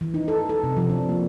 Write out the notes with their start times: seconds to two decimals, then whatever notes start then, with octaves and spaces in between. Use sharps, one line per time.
0.01 E3
0.14 D#4
0.28 A4
0.49 A4
0.64 C3
0.77 F3
0.90 D4
1.09 A#3